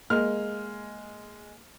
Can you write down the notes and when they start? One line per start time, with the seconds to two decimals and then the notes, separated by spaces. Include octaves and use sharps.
0.10 G#3 A#3 F6